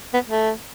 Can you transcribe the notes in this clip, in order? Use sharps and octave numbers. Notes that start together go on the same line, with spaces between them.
B3
A3